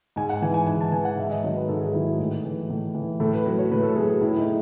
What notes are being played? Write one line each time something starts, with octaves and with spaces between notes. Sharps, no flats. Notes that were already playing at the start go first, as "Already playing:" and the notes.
G#2 G#5
F#5
E3 G#5
G#5
G#2 G#5
A5
E3 G#5
F#5
G#2 E5
D#5
D#3 F#3 C#5
B4
G#2 A4
G#4
D#3 F#3 E4
A2
E3
A2
E3
A2 A4
B4
F#3 B4
C#5
A2 B4
A4
F#3 G#4
G#4
A2 E4
D#4